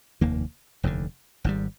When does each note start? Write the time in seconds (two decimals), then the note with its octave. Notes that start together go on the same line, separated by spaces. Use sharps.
0.21 F1 D#2 D#3 A#3
0.83 F1 D#2 D3
1.44 G#1 G#2 G3